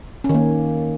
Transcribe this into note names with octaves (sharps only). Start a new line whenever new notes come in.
C#4
D#3
A#3